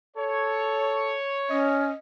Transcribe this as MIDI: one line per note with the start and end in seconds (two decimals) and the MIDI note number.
0.17 1.17 69
0.17 1.81 73
1.50 1.90 61
1.50 1.99 75